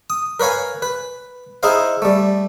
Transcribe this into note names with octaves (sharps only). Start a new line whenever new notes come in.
D#6
A#4 B4 C#5 F5 G#5
B4
D#4 E4 G#4 C5 F5
G3 A3